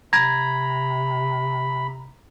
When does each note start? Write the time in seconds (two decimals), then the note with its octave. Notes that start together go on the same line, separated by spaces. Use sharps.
0.13 C3 A#5 B5 G#6 A#6